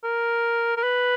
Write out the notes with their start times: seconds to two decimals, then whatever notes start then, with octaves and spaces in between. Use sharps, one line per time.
0.04 A#4
0.77 A#4
0.83 B4